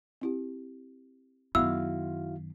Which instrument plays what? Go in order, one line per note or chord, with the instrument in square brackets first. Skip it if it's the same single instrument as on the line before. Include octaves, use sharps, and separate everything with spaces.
[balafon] C4 E4 G4
[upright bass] F#2 D#3 [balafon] B3 [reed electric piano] E4 F#4 F5 [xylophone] E6